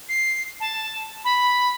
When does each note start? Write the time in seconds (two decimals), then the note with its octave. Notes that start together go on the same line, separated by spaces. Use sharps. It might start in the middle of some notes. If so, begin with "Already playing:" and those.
0.09 C7
0.60 A5
1.24 B5